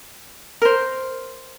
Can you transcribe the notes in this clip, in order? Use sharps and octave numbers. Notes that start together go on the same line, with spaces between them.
A#4 C5